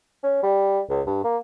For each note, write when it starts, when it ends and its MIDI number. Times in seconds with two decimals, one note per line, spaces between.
0.23 0.43 61
0.43 0.79 55
0.89 1.01 37
1.07 1.19 43
1.24 1.37 58